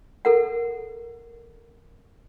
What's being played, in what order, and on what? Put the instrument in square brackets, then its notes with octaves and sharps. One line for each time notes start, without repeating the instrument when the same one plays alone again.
[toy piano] A4 A#4 F#5